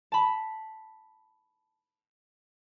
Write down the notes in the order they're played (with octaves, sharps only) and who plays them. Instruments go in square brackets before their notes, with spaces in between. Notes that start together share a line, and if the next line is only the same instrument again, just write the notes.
[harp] A5 B5